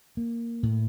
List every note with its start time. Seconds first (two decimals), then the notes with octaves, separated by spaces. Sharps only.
0.17 A#3
0.63 A2